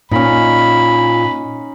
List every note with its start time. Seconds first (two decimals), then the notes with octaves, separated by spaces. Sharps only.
0.11 A#2 C#4 D#4 B5